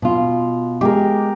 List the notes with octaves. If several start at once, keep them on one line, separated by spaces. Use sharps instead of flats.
B2 F4
G#3 G4 A#4